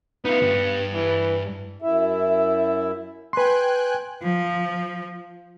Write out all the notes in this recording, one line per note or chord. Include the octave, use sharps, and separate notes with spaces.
B3 D#4 F4
G2
E3
F#2 E4 E5
B4 G5 G#5 C6 F#6
F3